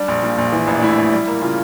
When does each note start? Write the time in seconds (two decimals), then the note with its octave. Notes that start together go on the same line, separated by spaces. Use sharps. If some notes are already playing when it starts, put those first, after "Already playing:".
Already playing: G3 D4
0.08 A#1
0.23 A#2
0.38 A#1
0.52 E3
0.67 A1
0.75 D4
0.82 A2 E4
0.98 A1
1.12 G3
1.28 A#3
1.42 C#3 F4